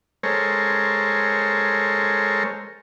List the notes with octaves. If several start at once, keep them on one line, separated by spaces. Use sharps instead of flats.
G#3 A4 A#4 C5 C#5